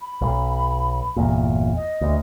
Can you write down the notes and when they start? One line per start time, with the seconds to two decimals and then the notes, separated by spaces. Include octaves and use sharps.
0.01 B5
0.21 B1
1.16 G1 E2 A#2
1.76 D#5
2.01 D2